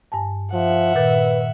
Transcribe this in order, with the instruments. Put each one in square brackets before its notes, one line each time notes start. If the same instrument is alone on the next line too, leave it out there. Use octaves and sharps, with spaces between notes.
[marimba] G2 G#5 A5
[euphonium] F3 [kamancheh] E5 F#5
[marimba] A#2 D#3 A6 [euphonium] B4